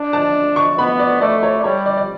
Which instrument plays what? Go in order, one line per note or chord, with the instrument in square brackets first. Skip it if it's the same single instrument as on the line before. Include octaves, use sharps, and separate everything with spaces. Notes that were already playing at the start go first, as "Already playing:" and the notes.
Already playing: [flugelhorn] D4
[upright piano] A5
C#6
[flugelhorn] B3 [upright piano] B5
[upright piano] D5
[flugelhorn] A3 [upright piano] D5
[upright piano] C#5
D5
[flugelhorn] G3 [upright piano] C#5
[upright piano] D5
D5